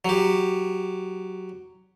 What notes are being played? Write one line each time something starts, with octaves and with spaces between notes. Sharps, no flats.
F#3 G4